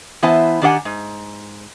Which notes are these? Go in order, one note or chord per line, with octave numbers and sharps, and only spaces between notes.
E3 B3 E4 C5 G#5 A5
D#3 D4 G4 D5 F#5 G#5
G#2